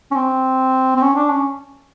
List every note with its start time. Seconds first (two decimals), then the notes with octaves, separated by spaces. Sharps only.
0.11 C#4
0.16 C4
0.96 C4
1.02 C#4
1.16 D4
1.30 C#4